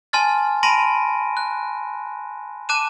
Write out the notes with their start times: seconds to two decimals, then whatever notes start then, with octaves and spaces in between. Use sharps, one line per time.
0.13 G#5 A5 C6 F6 A6
0.63 A5 B5 C6 A#6 D7 D#7
1.37 F#6
2.69 A5 D6 F#6 D#7 E7